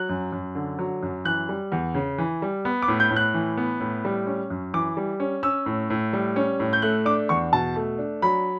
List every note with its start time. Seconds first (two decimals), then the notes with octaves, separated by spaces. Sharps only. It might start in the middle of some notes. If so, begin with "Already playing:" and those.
Already playing: F#3 F#6
0.09 F#2
0.32 F#2
0.55 D3
0.79 F#3
1.02 F#2
1.25 E3 F#6
1.49 G3
1.72 E2
1.95 C#3
2.18 E3
2.42 G3
2.65 B3
2.82 D6
2.88 A2
3.00 G6
3.11 A2
3.16 F#6
3.34 E3
3.57 B3
3.80 A2
4.05 G3
4.27 C#4
4.50 F#2
4.74 E3 D6
4.97 G3
5.20 C#4
5.43 C#4 E6
5.66 A2
5.90 A2
6.13 G3
6.36 C#4
6.60 A2
6.73 G6
6.82 A3 F#6
7.05 D4 D6
7.29 E2 C#6
7.53 B2 A5
7.76 A3
7.98 D4
8.22 F#3 B5